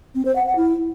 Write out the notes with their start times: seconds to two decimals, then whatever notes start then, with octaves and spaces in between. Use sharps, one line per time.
0.15 C4
0.25 C5
0.36 F#5
0.46 F#5
0.56 E4